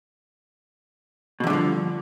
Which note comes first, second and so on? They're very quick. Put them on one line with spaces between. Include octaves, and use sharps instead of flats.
B2 E2 D3 G2 F3